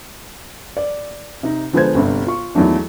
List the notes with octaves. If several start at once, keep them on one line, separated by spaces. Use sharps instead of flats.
D5
C3 D#4
D3 F3 G#3 B3 C5 G#6
G1 G2 C3
F4 C#6
E2 G#2 D#3 F#3 A3 D4